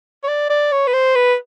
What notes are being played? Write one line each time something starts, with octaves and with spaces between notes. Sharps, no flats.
C#5
D5
D5
C#5
B4
C5
B4